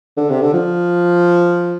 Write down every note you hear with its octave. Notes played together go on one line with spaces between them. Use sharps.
D3
C3
D3
F3